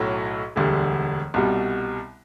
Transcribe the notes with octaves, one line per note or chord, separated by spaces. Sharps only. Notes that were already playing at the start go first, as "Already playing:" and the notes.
Already playing: B1 A2 F#3
E1 D2 D3 G3
C2 B2 G3